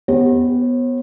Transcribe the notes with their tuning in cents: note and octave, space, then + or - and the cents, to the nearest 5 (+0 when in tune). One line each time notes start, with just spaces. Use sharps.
B3 +0 G4 +0 C#5 -45